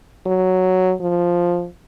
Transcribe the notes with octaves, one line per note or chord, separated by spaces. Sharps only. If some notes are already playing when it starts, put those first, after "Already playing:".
F#3
F3